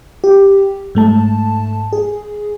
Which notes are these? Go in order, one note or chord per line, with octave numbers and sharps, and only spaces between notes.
G4
G#2 A3 A5
G#4